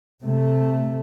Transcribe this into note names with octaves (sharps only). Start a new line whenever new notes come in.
C3 A3